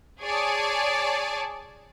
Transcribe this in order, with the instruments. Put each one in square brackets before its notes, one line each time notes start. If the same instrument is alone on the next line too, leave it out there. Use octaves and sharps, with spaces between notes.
[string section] G#4 C#5 D5 A5